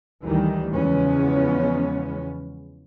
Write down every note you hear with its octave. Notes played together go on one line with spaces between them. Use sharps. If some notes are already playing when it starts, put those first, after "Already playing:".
D2 D#3 E3 G3
E2 C#3 F3 G#3 B3 C#4